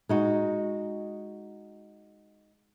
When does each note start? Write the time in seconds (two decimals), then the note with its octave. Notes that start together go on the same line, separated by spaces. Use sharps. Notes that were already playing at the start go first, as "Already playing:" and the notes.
0.09 G#3 D#4 F#4